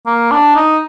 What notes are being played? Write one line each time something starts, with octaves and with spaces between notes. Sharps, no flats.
A#3
D4
D#4